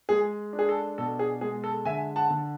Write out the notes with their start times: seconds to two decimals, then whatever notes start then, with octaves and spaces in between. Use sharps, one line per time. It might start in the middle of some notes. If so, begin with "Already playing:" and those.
0.09 G#3 G#4
0.53 D4
0.59 G#4
0.69 A4
0.98 B2 A4
1.19 G#4
1.41 G#3 G#4
1.64 A4
1.85 D3 E5 G#5
2.16 F#5 A5
2.30 D3